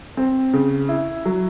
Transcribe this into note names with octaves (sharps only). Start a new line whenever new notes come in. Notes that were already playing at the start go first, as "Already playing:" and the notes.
C4
C#3
E4
F#3